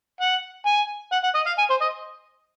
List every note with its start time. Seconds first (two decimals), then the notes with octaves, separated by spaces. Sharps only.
0.21 F#5
0.66 G#5
1.12 F#5
1.24 F#5
1.35 D#5
1.46 F5
1.58 G#5
1.70 C5
1.81 D#5